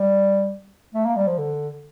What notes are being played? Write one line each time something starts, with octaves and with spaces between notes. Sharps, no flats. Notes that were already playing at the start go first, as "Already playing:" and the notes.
Already playing: G3
A3
A#3
G3
F3
D3